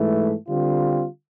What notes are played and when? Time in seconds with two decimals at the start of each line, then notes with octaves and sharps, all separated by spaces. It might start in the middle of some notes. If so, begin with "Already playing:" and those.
Already playing: G#2 E3 A3
0.47 D3 G3 C4 F4